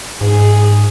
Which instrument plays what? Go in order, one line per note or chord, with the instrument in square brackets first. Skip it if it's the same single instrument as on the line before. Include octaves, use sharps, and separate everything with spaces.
[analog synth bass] G#2 [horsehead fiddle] G#4